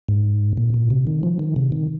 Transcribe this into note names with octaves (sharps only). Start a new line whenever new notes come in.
G#2
A#2
A#2
C3
D#3
F3
D#3
C3
D#3